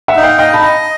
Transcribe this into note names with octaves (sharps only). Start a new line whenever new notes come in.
E5 F#5
D#4
F5 G5
D#5 F5 G5
A5 B5
D#5